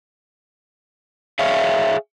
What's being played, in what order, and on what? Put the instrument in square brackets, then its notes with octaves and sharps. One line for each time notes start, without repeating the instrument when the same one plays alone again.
[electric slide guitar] G#4 C#5 E5 F5